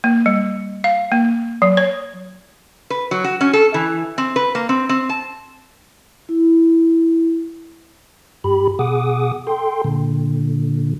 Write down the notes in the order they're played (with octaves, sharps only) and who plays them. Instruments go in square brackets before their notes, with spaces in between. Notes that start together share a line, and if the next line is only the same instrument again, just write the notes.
[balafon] A#3
G3
F5
A#3
F#3
C#5
[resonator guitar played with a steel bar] B4
F#3
F#4
C#4
A4
E3
C4
B4
A#3
C4
C4
A5
[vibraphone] E4
[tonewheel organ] G2 G4 B5
B2 G#4 F#5 D6 D#6
A4 G5 C6
A#2 D3